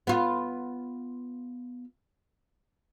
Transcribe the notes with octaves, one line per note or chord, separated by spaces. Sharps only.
B3 F4